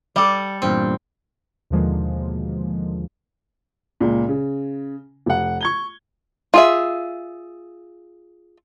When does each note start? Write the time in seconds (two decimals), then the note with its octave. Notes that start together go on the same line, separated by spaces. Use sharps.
0.16 G3 A4 D5
0.62 E2 G2 A#2 C4
1.70 D#2 B2 D3 F3 G#3 A#3
4.00 C#2 A#2
4.28 C#3
5.26 F1 F#5
5.61 C#6 G#6 G7
6.54 F4 G#4 E5